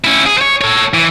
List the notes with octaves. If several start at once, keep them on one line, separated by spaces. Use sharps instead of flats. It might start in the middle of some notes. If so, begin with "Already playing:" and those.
C#4 E4
G#4
C5 C#5
A4 C#5
E3